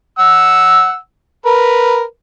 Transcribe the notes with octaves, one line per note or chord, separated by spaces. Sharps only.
F#5 E6
A#4 B4